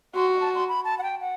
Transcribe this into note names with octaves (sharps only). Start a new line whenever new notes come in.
F#4 C6
A5
C6
B5
A5
F#5
G5
F#5